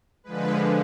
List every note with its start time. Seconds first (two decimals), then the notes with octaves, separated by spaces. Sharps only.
0.24 D3 F3 G#3 B4